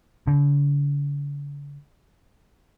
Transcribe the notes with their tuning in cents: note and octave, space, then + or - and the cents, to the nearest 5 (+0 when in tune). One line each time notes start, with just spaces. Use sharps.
D3 -45